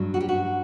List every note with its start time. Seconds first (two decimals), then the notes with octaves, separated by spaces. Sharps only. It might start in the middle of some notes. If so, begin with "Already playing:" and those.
Already playing: G2 F#3
0.14 F#4
0.20 G4
0.29 F#4